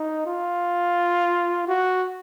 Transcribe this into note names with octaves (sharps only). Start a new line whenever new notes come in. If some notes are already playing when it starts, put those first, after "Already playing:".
Already playing: D#4
F4
F#4